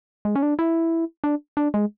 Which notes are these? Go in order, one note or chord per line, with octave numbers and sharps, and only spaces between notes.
G#3
C#4
D4
E4
D4
D4
G#3